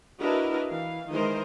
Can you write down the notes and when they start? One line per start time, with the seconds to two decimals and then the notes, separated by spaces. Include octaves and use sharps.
0.19 D4 E4 F#4 A#4 B4 D#5
0.69 E3 F5
1.10 D#3 E3 G#3 A#4 C5 D#5